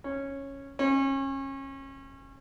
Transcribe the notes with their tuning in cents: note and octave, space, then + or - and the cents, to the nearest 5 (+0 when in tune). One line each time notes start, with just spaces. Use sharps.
C#4 -10
C#4 -30